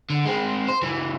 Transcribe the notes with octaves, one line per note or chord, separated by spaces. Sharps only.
D3
G#3 C4
C5
C#2 E3